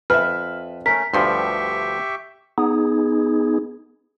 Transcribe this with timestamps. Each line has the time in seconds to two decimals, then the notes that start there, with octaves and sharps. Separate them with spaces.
0.10 F2 B4 E5 F6
0.86 A3 C#4 A#4 B6
1.14 D2 G2 F3 G4 E5 C6 C#6
2.58 B3 D#4 G#4